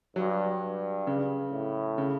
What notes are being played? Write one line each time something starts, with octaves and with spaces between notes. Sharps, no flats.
G2 F#3
G2
C#3
A2
C#3